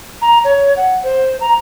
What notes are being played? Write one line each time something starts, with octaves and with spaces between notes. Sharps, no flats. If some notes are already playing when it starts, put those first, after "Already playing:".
A#5
C#5
F#5
C5
A#5